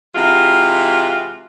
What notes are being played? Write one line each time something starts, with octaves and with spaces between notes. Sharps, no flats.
C3 E3 G#3 F4 F#4